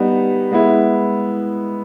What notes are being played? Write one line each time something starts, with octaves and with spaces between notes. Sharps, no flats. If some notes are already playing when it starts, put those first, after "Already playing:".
Already playing: G3 B3 D#4
G#3 B3 E4